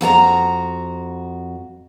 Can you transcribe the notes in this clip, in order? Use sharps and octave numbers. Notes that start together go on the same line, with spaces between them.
F2 F#4 A5 A#5